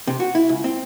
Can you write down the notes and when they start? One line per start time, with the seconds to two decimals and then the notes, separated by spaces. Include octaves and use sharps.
0.07 C3
0.20 F#4
0.35 E4
0.49 C#2
0.64 C4